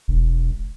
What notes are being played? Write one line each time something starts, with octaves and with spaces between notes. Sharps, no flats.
E1